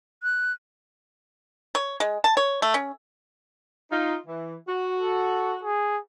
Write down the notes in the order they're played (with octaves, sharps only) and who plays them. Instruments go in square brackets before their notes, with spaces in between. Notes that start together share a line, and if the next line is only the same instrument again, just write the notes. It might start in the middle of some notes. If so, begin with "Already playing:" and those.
[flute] F#6
[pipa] C#5
G#3
A5
C#5
A3
C#4
[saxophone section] D#4 F4
E3
F#4
[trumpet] A4
G#4